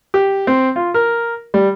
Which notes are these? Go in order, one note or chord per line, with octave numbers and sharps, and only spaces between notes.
G4
C4
F4
A#4
G3